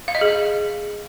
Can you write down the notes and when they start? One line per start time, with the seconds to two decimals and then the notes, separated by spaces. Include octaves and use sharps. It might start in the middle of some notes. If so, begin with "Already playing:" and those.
0.08 F5
0.15 D#5
0.21 G#4